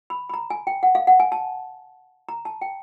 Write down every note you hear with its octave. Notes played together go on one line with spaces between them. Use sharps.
B5
B5
A#5
G#5
G5
F#5
F5
F#5
G#5
A5
A#5
A5
G5